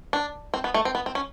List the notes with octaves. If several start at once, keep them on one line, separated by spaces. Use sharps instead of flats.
D4
C4
B3
A3
C4
B3
C4
C#4